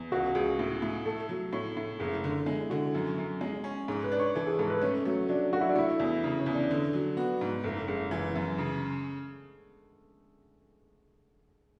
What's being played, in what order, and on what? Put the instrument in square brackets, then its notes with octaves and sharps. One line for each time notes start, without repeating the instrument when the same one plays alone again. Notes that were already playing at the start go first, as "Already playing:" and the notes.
Already playing: [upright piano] E2
[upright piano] C#2 [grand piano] F#4
[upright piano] C#2 [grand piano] G#4
[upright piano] A2
A2
[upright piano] A3 [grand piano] A4
[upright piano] F#3
[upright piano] A2 [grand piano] C#5
[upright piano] A2
[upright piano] F#1 [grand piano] G#4
[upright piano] D3
[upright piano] G#3 [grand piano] E4
[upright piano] D3 [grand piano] F#4
[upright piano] F#2
F#2
G#3
C#4
[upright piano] G#2 [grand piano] G#4
[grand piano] B4
[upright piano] D4
[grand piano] C#5
[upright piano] E3 [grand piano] A4
[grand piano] G#4
[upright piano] G#2 [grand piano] A4
[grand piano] B4
[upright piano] A3 [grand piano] C#4
[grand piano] F#3 [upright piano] A3
[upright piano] F#3 [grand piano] D4
[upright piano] F#3 [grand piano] F#4
[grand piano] E4
D4
[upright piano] A3 [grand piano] E4
[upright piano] E2
C#3
[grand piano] C#4
[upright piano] E2
[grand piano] D4
[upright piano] D3
F#3
[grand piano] B3 [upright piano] F#4
[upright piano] G#2
[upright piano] F#1 [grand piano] A3
[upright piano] F#1 [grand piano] G#3
[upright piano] E3
F#2
C#3